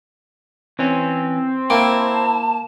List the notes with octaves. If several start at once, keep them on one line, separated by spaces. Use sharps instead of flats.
E3 C4 C#4
A#3 E4 G5 A5